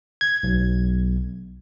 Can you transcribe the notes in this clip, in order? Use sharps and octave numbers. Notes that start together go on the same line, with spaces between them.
G#6
B1